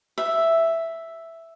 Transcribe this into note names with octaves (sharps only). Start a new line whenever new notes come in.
E5